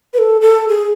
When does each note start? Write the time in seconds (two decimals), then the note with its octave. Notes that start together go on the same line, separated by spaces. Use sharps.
0.14 B4
0.18 A4
0.41 A4
0.69 G#4